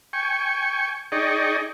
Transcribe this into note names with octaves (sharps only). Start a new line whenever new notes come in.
G5 G#5 C#6
D#4 G#4 D5 D#5 G5 C#6